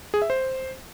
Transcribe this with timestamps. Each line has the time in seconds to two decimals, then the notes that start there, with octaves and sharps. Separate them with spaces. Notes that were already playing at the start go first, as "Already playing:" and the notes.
0.14 G#4
0.22 E5
0.30 C5